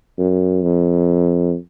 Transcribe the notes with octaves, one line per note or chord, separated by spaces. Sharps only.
F#2
F2